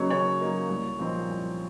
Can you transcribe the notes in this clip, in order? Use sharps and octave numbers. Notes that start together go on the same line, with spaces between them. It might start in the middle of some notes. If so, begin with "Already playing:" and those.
Already playing: C#3 F#3 A#3 D#4 C#5
C#3 C#5
F#3 A#3 D#4
C2
A#2 F3 C4 D#4
C2